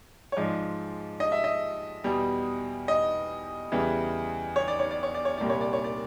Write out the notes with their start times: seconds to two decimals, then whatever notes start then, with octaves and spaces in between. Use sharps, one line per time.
0.32 C#5
0.37 G#2 F3 G#3 D5
1.20 D#5
1.32 E5
1.44 D#5
2.04 E2 B2 G3
2.88 D#5
3.72 E2 C#3 E3 G3
4.56 C#5
4.68 D5
4.79 C#5
4.91 D5
5.03 C#5
5.14 D5
5.25 C#5
5.38 C2 A#2 G3 D5
5.50 C#5
5.61 D5
5.73 C#5
5.84 D5